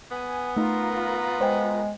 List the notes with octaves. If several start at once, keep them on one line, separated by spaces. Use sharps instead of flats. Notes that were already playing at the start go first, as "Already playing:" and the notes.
B3 G#5
A3 D#4 F4 A#4 A#5
G#3 C5 G5